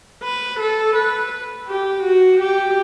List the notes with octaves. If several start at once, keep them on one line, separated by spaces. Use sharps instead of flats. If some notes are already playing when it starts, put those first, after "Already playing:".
B4
A4
B4
G4
F#4
G4